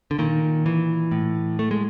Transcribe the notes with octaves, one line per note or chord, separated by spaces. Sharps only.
D3
A#2 D#3
E3
A2
A3
G#3